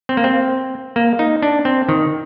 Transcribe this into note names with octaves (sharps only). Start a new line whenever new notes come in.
C4
A#3
C4
A#3
D#4
D4
C4
D#3